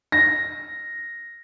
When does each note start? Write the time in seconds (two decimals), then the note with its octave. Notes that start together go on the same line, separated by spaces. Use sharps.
0.12 A#6